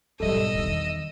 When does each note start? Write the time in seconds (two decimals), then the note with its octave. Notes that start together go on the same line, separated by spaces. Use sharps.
0.20 G#2 B2 G3 A4 D#5 E6
0.55 E2 D#3